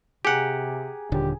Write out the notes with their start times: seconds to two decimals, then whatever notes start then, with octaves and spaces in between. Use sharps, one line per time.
0.25 C3 G4 G#4 F#5 A#5
1.12 D#1 D3 G4